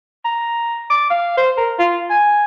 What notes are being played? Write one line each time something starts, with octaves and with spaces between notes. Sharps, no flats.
A#5
D6
F5
C5
A#4
F4
G#5